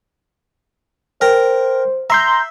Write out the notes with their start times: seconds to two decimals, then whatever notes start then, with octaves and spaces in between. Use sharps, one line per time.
1.21 A#4 C5 G5 A#5
2.10 E5 A#5 C6 G6